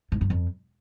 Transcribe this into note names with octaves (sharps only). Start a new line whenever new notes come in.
G#2
G2
F2